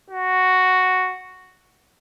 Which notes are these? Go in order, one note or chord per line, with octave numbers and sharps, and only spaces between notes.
F#4